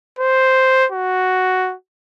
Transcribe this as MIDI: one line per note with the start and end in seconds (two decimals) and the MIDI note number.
0.19 0.86 72
0.92 1.74 66